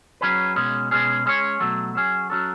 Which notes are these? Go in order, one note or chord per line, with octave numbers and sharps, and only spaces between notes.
F#3 C#4 G#4 B4
B2 G#3 C#4
B2 G#3 C#4 G#4
G#3 C#4 G#4 C#5
B2 F#3 A3
F#3 C#4 G#4
F#3 C#4 F#4 A4